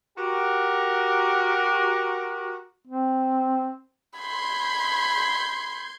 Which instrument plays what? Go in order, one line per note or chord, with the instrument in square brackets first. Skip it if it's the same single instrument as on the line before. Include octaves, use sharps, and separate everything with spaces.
[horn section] F#4 G4 A#4
[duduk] C4
[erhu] B5 [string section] C6 G6 G#6